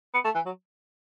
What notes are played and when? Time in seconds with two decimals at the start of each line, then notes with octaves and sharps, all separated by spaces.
0.14 B3
0.25 A3
0.35 E3
0.46 F#3